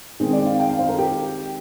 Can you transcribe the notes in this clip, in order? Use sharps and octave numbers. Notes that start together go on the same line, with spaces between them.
D#3 G#3 C4 G#4
D5
F5
G5
F5
C5
A#4
G4